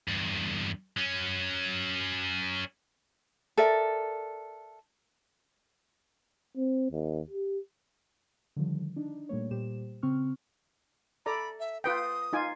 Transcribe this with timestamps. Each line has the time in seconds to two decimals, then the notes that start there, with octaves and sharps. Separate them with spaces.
0.08 E2 G2
0.97 F#3 C#4
3.57 A4 A#4 D5 E5
6.57 C4
6.91 D#2
7.30 G4
8.56 D3 D#3 F3 G3
8.96 D4 D#4
9.29 A#2 G3 A3 A#3 C#5
9.51 A#2 G3 G4 C5 E7
10.03 C#3 C4 C#6 F6
11.26 A4 D5 A#5 B5
11.60 E5
11.84 F4 B4 G5 D#6
12.33 D#4 F4 G#5